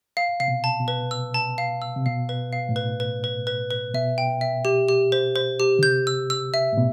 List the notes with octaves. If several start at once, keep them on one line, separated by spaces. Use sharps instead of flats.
F5
C3 F5
B2
A5
B2
B4
E6
A5
F5
E6
C3
B2 F5
B4
F5
A2
B4
B4
B4
B4
B4
B2 E5
G5
E5
G4
G4
C5
C5
G4
D3
C3 G6
E6
E6
E5
A2
B2